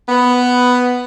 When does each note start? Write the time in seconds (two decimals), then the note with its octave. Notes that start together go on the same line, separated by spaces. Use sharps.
0.08 B3